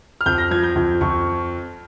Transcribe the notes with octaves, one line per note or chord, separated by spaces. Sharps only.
F6
F2 G6
A#6
F3 G#6
G6
F2
F2 C#6